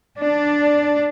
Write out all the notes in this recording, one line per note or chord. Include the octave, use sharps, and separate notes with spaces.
D4